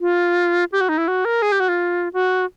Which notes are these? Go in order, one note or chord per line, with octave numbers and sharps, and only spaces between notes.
F4
G4
F#4
D#4
E4
F#4
A#4
G#4
G4
F#4
F4
F#4